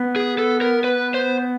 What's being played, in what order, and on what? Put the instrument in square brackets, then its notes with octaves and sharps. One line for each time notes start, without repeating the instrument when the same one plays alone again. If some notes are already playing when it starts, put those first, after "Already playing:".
Already playing: [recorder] B3
[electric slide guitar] G#4
A4
A#4
B4
C5